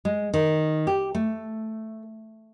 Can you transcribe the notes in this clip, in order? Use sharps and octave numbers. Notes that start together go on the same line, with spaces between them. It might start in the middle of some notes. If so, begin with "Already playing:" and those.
G#3
D#3
G4
A3